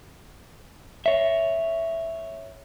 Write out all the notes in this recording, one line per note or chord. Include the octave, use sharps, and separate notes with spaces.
C#5 E5